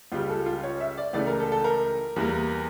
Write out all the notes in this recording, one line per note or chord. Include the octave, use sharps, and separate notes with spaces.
C#2 C#3 G3 F4
A4
F4
C#5
E5
D5
C#2 C#3 E3 A3 D5
A#4
A4
A4
A#4
E2 E3 G3 A#3